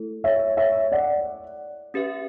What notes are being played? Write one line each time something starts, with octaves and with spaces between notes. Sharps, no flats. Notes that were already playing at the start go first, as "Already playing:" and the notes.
Already playing: A3 E4 A4
C#5 E5
C#5 E5
D5 F#5
C#4 G4 B4 E5